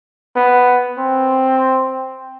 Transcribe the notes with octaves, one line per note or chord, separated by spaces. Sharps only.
B3
C4